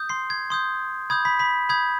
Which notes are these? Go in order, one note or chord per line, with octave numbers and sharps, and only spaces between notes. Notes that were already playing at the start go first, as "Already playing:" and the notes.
Already playing: D#6 G6
C6 C7
G#6
C6 D#6 G6
B5 D#6 G6 G#6
B5 B6
B5 B6
B5 D#6 G6 G#6